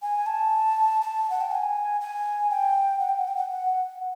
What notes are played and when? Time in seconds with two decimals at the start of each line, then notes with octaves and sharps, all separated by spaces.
0.02 G#5
0.26 A5
1.02 A5
1.30 F#5
1.41 G5
1.51 A5
1.55 G#5
2.01 G#5
2.50 G5
3.00 F#5
3.09 G5
3.19 F#5
3.28 G5
3.37 F#5
3.50 F#5